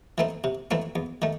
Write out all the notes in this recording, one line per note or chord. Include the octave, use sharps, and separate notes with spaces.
E3 A3 C4 D#4
C3
E3 A3 C4 D#4
E2
D#3 A3